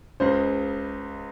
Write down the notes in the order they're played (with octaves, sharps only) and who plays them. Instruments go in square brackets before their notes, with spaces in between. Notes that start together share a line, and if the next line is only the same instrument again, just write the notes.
[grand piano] C#2 C#3 G#3 C5